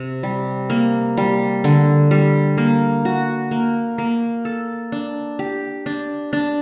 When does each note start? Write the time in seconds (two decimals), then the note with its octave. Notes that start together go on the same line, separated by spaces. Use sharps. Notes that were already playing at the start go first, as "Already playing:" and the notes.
Already playing: C3
0.23 G3
0.70 A#3
1.17 G3
1.64 D3
2.11 G3
2.57 A#3
3.05 F#4
3.51 A#3
3.98 A#3
4.45 A4
4.92 D4
5.39 G4
5.86 D4
6.33 D4